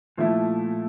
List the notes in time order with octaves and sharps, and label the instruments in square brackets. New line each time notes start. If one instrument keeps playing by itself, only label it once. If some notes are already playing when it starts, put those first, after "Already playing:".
[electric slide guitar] A#2 [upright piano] F3 A3 E4